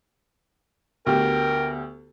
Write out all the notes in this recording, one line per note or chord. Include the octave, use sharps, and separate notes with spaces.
D2 B3 G4 A#4 G5 F6